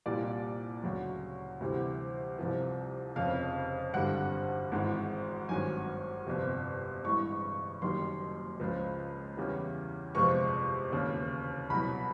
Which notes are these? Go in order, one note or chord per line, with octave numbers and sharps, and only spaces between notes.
C2 A#2 G3 D5
D2 C#3 F#3
D2 C3 E3 G3
C2 C3 F3
F1 F2 C#3 F5
G#1 G2 D3 G3 F#5
G#1 G#2 E3 G#3
G#1 G2 D#3 F#3 G#5
G1 F2 C3
A1 G2 E3 G#3 C#6
F#1 F#2 D#3 G3 C6
C#2 C#3 F3 G#3
E2 C#3 E3 G3
G1 F2 C3 F3 G#3 C#6
E1 D#2 C#3
C2 B2 F#3 B5